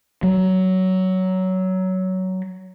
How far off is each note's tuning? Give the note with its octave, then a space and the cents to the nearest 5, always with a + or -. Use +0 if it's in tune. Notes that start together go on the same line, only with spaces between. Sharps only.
F#3 +15